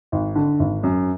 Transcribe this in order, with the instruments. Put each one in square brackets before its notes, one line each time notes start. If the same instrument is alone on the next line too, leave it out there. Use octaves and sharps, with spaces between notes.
[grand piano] G#1
D3
G#1
F#2